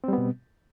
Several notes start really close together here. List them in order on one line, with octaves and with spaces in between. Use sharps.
C4 G3 B3 B2